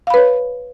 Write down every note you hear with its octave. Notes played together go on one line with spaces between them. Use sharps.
B4 C#5 F5 B5